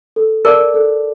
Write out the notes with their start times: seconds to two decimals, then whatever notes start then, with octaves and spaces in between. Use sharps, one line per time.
0.16 A4
0.45 A#4 D5 A5 D6
0.74 A4